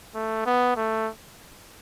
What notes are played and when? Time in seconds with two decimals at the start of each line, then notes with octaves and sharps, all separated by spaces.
0.15 A3
0.46 B3
0.77 A3